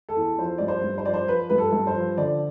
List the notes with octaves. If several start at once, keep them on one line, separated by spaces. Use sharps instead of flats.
A4
E2
F3 C5
G2 D5
C5
G2
C5
F3 D5
C5
F3 B4
G2 B4
A4
G2
C5
F3
D3 D5